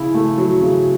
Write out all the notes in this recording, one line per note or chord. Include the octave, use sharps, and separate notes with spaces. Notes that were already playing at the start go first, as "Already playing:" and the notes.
Already playing: C#3 E4
A3
F#3
C#3